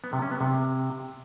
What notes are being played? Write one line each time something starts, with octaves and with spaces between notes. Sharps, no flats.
B3
C3
C#4
B3
C3